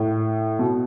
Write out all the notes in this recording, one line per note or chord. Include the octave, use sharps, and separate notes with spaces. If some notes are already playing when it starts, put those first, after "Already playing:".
Already playing: A2
B2